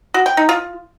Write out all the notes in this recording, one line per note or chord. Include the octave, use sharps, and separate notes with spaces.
F#4
G5
D#4
F4